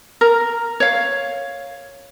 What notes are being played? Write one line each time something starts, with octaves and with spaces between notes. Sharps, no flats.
A#4
C#5 F5